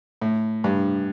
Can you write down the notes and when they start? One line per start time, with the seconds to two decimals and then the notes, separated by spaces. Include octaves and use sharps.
0.22 A2
0.64 G2